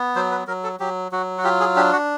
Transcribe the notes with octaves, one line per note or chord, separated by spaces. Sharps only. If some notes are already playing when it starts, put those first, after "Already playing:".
Already playing: B3
F#3 C5
B4
F#3 A#4
A4
F#3 G4
F#3 F#4
F#4
F4 G4
G#4
D4 G4
F#4